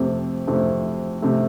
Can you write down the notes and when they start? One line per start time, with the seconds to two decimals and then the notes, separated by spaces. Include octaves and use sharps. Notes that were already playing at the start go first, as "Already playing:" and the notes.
Already playing: F2 C3 A3
0.47 F2 C3 A3
1.22 C3 A3